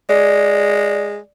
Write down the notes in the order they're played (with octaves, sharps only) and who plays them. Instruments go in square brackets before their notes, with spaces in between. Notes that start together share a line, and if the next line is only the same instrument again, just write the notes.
[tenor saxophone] G#3 [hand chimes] D5